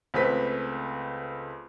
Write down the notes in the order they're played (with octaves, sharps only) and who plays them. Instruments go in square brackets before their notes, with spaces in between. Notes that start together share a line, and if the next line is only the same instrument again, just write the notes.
[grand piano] C#2 A3 C4 B4 B6